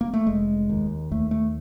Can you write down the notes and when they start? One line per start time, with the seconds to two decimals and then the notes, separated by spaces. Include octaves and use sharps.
0.01 A#3
0.14 A3
0.27 F1 G#3
0.69 D#2
1.11 D#2 A3
1.31 A3